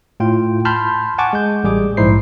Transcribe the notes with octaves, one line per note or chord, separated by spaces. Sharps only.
A2 F4 G5
A5 B5 C6 F6 G6
F#5 G#5 A5 C#6 D6
G#3 G6
A1 G3 G#4 D6
A#1 G#2 D#4 E4 C5 C7